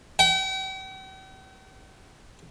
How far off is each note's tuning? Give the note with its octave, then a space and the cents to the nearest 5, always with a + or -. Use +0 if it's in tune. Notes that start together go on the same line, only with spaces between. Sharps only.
G5 -45